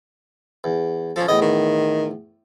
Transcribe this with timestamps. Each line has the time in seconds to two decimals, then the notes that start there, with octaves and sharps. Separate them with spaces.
0.64 E2
1.16 F3 C#4 A4
1.28 E2 A2 D#5
1.41 D#3